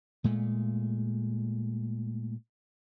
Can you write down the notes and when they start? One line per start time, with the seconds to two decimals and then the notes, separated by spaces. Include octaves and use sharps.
0.24 A#2 G#3 A3